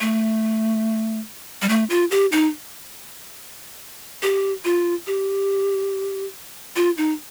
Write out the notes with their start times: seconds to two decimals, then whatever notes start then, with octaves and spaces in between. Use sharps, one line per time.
0.01 A3
1.62 G3
1.69 A3
1.90 F4
2.11 G4
2.32 D#4
4.22 G4
4.65 F4
5.07 G4
6.76 F4
6.97 D#4